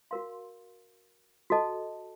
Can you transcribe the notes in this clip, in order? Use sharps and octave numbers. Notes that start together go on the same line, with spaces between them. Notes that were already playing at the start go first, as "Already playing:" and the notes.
F#4 A#4 F5 C6
F#4 A4 D#5 A5